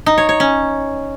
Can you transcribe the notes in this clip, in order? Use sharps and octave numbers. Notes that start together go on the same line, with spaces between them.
D#4
C#5
C#5
C#4